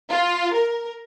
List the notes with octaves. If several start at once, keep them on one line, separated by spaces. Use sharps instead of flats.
F4
A#4